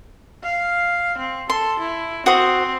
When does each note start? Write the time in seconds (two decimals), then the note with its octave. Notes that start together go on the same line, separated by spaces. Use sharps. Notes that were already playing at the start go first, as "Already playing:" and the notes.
0.43 F5
1.18 C4
1.50 A4 C6
1.79 E4
2.26 C4 F#4 C5 D#6